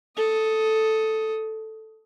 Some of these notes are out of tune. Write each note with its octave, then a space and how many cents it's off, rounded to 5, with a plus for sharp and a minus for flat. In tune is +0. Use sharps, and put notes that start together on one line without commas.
A4 +0 D#6 +15